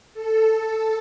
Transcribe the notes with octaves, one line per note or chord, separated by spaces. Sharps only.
A4